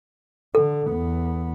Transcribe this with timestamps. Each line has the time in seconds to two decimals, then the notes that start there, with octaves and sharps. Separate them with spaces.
0.55 D3 A4
0.88 E2 B3